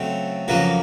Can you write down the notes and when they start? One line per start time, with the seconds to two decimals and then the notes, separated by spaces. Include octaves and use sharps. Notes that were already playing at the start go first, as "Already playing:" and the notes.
Already playing: C#3 F#3 A3 C4
0.48 F2 C#3 F#3 A#3 B4